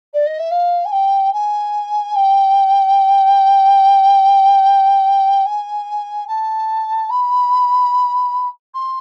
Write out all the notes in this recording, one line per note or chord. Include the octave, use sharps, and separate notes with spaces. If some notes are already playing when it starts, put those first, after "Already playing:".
D5
D#5
E5
F5
G#5
G5
G#5
G5
G#5
A5
B5
C6